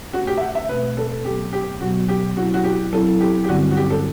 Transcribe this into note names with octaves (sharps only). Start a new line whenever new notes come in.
B2 A3 C4 F#4
G4
E5
F#5
E5
B2 A3 C4 B4
A4
B2 F#3 B3 G4
G4
B2 F#3 B3 F#4
G4
F#3 C4 E4 F#4
F#4
G4
F#3 C4 E4 A4
G4
G4
G2 D3 G3 C4 F#4
F#4
G4
A4